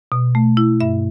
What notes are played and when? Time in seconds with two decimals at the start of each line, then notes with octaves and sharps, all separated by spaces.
0.12 B2
0.35 A3
0.57 E4
0.80 G2 E5